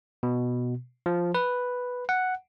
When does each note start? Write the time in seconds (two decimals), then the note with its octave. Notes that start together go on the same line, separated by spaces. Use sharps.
0.23 B2
1.06 F3
1.35 B4
2.09 F#5